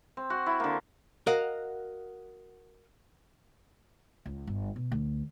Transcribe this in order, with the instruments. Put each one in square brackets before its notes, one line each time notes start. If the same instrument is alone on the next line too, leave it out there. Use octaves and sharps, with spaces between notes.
[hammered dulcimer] C4
F#4 C6
E4
D3 A#3
[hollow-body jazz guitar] F#4 A#4 D#5 F5 F#5
[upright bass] C#2
G1
B2
D2